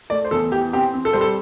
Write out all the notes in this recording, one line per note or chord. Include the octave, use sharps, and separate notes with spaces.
A3 D5
C5
E2 A4
E3 G4
C4 G4
C4
A4
G3 C5
A4